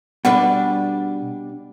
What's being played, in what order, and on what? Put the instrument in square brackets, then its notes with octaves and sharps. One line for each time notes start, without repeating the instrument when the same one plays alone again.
[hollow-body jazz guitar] B2 [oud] G3 D4 B4 [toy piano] F#5